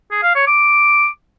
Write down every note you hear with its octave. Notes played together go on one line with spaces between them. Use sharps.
G#4
F5
C#5
D6